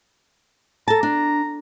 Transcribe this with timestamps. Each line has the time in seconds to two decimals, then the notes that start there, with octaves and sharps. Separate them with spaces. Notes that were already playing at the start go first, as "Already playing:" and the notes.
0.88 A4 A5 A#5
1.03 D4